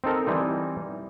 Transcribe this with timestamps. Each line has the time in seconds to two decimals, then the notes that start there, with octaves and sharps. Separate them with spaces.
0.04 C4 D#4 A4 A#4
0.27 E3 G3 C4 D#4